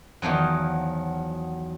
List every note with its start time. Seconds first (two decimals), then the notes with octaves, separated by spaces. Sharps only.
0.22 E2 D#3 F3 F#3